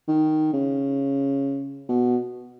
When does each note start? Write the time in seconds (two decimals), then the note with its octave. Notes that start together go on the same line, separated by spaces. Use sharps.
0.08 D#3
0.53 C#3
1.89 B2